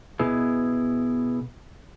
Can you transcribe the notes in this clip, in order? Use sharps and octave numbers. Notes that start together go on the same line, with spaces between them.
B2 B3 E4 G#4